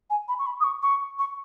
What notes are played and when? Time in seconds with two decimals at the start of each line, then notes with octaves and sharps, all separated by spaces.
0.10 G#5
0.28 B5
0.39 C#6
0.46 B5
0.60 D#6
0.63 C#6
0.82 C#6
1.19 C#6